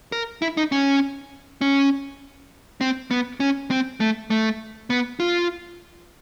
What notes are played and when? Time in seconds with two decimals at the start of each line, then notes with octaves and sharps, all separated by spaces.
0.12 A#4
0.42 E4
0.57 D#4
0.72 C#4
1.61 C#4
2.81 C4
3.11 B3
3.40 C#4
3.70 C4
4.00 A3
4.30 A3
4.90 B3
5.20 F4